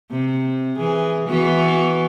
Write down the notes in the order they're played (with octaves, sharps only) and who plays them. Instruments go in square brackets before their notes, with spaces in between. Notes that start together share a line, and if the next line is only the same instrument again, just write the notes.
[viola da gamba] C3
E3 G#4
E3 B3 F#4